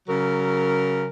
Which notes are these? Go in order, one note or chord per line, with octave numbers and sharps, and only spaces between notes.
C#3 F#3 A#4